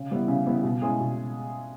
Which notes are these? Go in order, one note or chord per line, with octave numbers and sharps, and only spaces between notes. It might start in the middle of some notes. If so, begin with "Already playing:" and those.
Already playing: C#3
G3 B3 E4
C#3
G3 B3 E4
B2
G#3 C#4 E4 G#4
B2